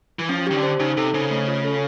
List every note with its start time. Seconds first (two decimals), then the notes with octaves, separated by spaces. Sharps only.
0.19 E3
0.29 F3 C#4
0.47 D#3 G4
0.54 D3
0.63 C5
0.80 C#3 D#4
0.97 C3 A4
1.14 C#3 C5
1.31 A3
1.48 F4
1.65 A4